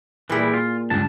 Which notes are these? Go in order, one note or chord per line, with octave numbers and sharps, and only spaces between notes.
A#2 E3 G3 E4 G#4
F4
C#2 G2 A5